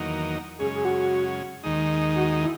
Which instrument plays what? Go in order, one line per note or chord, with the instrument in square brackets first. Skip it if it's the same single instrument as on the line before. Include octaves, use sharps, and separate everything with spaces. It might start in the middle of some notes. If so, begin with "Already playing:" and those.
Already playing: [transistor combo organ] E2 D#3 F#3 A#3 D#4
[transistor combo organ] F#2 C#3 G#3 C#4 [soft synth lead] G#4
[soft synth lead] G#4
F#4
[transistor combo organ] D#2 D#3 G#3 D#4
[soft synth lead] F#4
E4